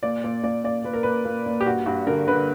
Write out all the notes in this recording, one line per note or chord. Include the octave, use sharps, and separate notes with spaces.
A#2 D5
A#2
A#2 D5
A#2 D5
A#2 B4
A#4
A#2 B4
A#2
A#2
G4
G2 F#4
G2 F#4
D3 A#4
D3 B4